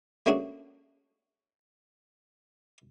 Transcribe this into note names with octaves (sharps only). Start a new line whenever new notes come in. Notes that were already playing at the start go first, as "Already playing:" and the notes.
A3 A#3 C#4 D4 F#4 G#4